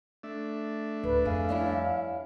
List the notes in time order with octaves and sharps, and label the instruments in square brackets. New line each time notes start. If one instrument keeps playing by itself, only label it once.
[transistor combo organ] A3 D4 E5
[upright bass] D1 [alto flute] B4
[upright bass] F2 [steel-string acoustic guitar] G#4 [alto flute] F5
[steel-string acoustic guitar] G2 C#4 E4